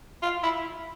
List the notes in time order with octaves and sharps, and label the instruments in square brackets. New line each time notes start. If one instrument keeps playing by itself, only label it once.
[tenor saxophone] F4
E4